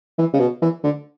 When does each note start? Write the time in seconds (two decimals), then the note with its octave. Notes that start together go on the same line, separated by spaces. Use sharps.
0.18 E3
0.33 C#3
0.40 B2
0.62 E3
0.83 D3